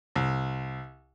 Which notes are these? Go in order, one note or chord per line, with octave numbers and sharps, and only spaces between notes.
C2